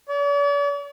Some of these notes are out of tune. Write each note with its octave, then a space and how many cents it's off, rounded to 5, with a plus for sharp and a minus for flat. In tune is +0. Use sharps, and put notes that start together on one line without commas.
D5 -45